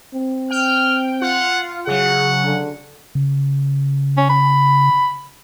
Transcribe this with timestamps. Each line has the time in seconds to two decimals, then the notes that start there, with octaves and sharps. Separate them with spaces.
0.14 C4
0.50 G5 F6
1.22 F4 F#5
1.87 C#3 F#3 G#4 F#5
2.45 D3
3.15 C#3
4.17 C#4
4.29 B5